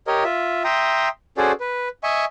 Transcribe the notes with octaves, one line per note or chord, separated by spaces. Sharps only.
G4 A#4 C#5 D#5
F4 E5
E5 G5 A#5 C6 D#6
C#4 F#4 G#4 A4 C5 D5
B4
D#5 E5 G#5 C#6